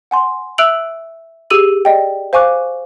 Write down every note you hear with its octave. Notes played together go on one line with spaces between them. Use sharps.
F#5 G#5 C6
E5 E6 F#6 D7 F7 F#7
G4 G#4 E6 D#7 F#7
D5 D#5 G5
C5 F5 G#5 C#6 D6 F#6